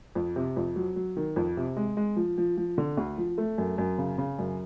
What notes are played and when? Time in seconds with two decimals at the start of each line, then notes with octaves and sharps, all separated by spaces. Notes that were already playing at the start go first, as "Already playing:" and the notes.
0.15 F2
0.36 C3
0.57 F2
0.76 F#3
0.96 F#3
1.17 D#3
1.36 F2
1.57 C3
1.77 G#3
1.97 G#3
2.16 F3
2.38 F3
2.57 F3
2.78 D3
2.97 D2
3.18 F3
3.38 A3
3.58 F#2
3.78 F#2
3.98 C#3
4.18 C#3
4.39 F#2